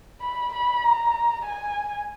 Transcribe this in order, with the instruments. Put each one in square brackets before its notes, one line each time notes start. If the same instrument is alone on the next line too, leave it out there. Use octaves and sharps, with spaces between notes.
[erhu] B5
B5
A#5
G#5